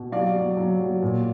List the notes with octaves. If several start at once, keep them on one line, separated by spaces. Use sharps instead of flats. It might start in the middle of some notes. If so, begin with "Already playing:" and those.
Already playing: B2
F#3 D5 F5
F#3
F#3
F#3
A#2